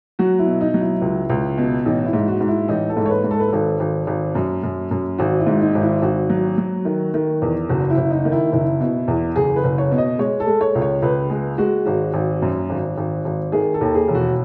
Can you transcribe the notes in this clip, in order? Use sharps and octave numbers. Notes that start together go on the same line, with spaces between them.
F#3 F#4
E4
B2
D#4
F#3
E4
C#2
C#2
B2
A1 D#4
E4
G#2
F#4
G#2
E4
A1 D#4
A4
G#2
C#5
B4
G#2
A4
B4
G#1 A4
G#1
G#1
F#2
F#2
F#2
G#1 F#4
E4
G#2
D#4
G#1
E4
G#1 F#4
F#3
F#3
D#3
D#3
E2
F#1 F#4
E4
F#1
D#4
D#3
E4
F#1 E4
B2
E2
F#1 G#4
B4
F#1
C#5
B2
D#5
G#3 C#5
A4
G#3
C#5
C#2
C#5
C#2 B4
G#3 G#4
G#3 F#4
G#1 F#4
G#1
F#2
G#1
G#1
G#1
D#3 G#4
A4
D#2
G#4
E1
F#4